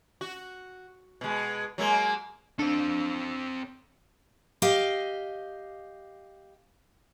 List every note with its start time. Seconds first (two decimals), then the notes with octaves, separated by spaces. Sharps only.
0.21 F#4
1.21 B2 G#3
1.78 F#3 G#3 A#3
2.59 C4 D4 A4
4.62 G4 D#5 F5